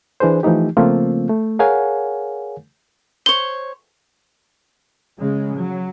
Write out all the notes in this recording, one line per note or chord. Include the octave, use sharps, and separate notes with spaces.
E3 D4 G#4 B4 C5
E3 F3 A3 D#4 G4
C#3 F3 A3 A#3 C4 F4
A3
G#4 A#4 C#5 F5 F#5 G#5
C5 C#5 G7
C#3 G#3
F#3